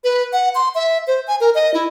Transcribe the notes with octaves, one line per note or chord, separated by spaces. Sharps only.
B4
F#5
C6
E5
C5
G#5
A#4
D#5
E4